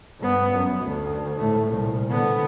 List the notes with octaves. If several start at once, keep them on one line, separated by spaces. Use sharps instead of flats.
G2 B3
F#2
D2
A2 A3
C2 A#2
D3 B3